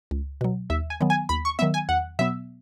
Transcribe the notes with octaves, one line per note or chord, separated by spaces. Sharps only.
C#2
B2 F#3
D#2 E5
G#5
D#3 F#3 B3
G#5
D#2 B5
C#6
D#3 F#3 B3 E5
G#5
E2 F#5
B2 F#3 B3 E5